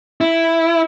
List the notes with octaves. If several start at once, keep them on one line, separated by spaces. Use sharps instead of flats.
E4